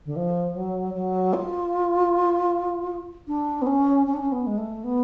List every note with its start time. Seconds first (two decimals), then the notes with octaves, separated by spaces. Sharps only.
0.05 D3
0.16 F3
0.54 F#3
0.94 F#3
1.33 F4
3.27 D4
3.61 B3
3.66 C#4
4.06 C#4
4.13 D4
4.21 C#4
4.32 B3
4.46 G#3
4.57 A3
4.83 B3